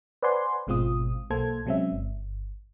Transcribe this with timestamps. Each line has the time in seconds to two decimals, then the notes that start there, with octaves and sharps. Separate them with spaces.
0.23 B4 C5 D5 F#5 G#5 C6
0.67 G#1 B2 G#3 C4 F4 D#6
1.30 B1 A#3 A4 C5 G#6
1.66 C3 F#3 G#3 C4 C#4 E5
1.92 G1